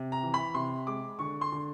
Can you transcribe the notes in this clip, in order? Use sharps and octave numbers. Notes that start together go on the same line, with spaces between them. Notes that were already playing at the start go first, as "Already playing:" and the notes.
Already playing: C3
A#5
E3
B5
C3 C6
G#3 D6
D3 C#6
C6
D3